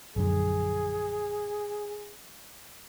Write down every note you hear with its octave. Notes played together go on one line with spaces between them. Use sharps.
A#1 F#2 D3 G#4